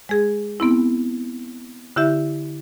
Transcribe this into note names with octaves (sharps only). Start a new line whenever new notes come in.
G#3 G#4
B3 C4 E4
D3 E4 G4 E5